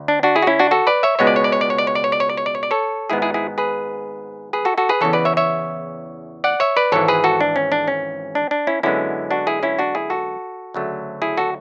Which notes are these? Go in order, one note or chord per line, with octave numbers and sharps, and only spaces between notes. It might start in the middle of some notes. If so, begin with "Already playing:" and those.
Already playing: D2
D4
D4 F#4
E4 G#4
F#4
C#4 E4
D4 F#4
F#4 A4
B4 D5
C#5 E5
C#2 B2 G#3 B3 C#5
D5
C#5
D5
C#5
D5
C#5
D5
C#5
D5
C#5
D5
C#5
D5
C#5
D5
C#5
D5
A4 C#5
G#1 G#2 G#3 B3 E4 G#4
E4 G#4
E4 G#4
G#4 B4
G#4 B4
F#4 A4
F#4 A4
G#4 B4
E2 C#3 E3 A4 C#5
B4 D5
C#5 E5
C#5 E5
D5 F#5
C#5 E5
B4 D5
G#1 G#2 E3 A4 C#5
G#4 B4
F#4 A4
D4
C#4
D4
C#4
D4
D4
C#4 E4
F#2 D3 G#3 B3 C#4 E4
D4 F#4
E4 G#4
C#4 E4
D4 F#4
E4 G#4
F#4 A4
D2 C#3 F#3 A3
E4 G#4
F#4 A4